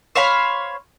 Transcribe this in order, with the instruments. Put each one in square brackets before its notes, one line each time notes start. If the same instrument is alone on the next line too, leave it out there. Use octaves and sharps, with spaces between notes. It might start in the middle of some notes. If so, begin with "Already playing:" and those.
[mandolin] C5 C#5 F5 B5